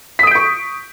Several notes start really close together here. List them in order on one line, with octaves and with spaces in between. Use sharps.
B6 D#6 D7 G6 C#6